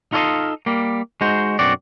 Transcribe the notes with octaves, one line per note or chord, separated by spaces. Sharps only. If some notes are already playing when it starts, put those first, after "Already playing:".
D#4 F4 A4 C#5 D#5 F5
G3 A#3
G#3 D#4 F#4 C5
B1 F#2 C4 F#4 D5